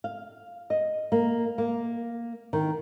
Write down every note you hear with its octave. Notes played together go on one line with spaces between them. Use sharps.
F5
D#5
A#3
A#3
D#3